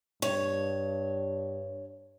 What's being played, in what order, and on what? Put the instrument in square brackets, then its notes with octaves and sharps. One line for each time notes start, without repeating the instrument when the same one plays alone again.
[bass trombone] G2 [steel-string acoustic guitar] C#5